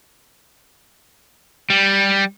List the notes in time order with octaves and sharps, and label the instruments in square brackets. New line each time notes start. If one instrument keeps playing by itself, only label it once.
[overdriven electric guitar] G3